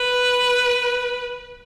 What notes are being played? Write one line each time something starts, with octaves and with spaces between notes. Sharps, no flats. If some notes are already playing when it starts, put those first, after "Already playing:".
Already playing: B4